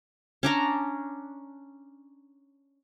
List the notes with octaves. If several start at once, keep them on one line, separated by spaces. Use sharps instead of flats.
C#4 D4 A#5